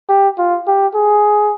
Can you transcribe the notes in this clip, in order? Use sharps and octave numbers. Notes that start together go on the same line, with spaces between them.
G4
F4
G4
G#4